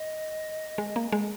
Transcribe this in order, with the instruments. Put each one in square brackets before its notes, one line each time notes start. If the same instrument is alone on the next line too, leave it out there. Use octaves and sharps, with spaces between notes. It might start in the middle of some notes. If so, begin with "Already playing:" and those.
Already playing: [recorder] D#5
[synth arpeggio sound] G#3
A#3
G#3